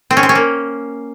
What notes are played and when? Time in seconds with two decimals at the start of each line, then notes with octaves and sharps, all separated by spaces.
0.11 C4
0.17 C#4
0.23 C4
0.29 C#4
0.35 A#3